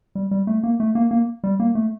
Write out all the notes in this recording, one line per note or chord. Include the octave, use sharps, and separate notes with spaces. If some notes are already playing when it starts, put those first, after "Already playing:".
G3
G3
A3
A#3
A3
A#3
A#3
G3
A#3
A3